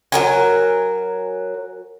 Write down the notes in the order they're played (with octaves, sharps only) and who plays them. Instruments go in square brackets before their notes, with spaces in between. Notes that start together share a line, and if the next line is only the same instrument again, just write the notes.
[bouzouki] F#3 A#4 G#5